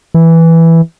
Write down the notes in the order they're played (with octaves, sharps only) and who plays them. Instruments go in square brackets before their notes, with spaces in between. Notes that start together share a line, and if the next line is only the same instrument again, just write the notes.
[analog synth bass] E3